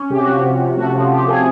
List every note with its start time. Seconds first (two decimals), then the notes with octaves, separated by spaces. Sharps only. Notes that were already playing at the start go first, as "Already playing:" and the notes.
Already playing: C#4
0.10 C3 G4
0.20 F#4
0.27 F3 G4
0.44 C3
0.61 C3
0.77 A3 F#4
0.94 F3
1.11 F3 G4
1.28 A3 G#4